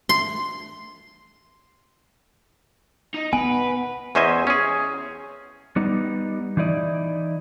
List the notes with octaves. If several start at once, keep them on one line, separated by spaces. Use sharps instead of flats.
C6
D#4
B3 B4 G#5
E2 C#4 C5 D#5 E5 G#5
C#4 G#4
G3 B3 D#4
E3 D#4 E4 D5 D#5